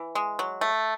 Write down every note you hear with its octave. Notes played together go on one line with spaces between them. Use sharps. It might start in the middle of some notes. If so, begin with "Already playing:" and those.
Already playing: E3
G#3
F#3
A3